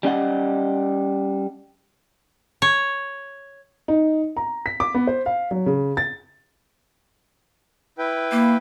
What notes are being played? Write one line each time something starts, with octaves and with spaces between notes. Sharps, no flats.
G3 C#4 D#5 F#5
C#5
D#4
A#5
B6
D6
B3
C5
F5
F#3
C#3
A6
E4 B4 G5
A#3